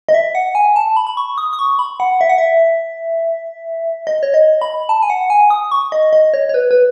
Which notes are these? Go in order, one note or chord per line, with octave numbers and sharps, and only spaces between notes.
D#5
E5
F#5
G#5
A5
B5
B5
C#6
D#6
D#6
C#6
B5
F#5
E5
F#5
E5
D#5
C#5
D#5
B5
A5
G#5
F#5
G#5
D#6
C#6
D#5
D#5
C#5
C#5
B4
B4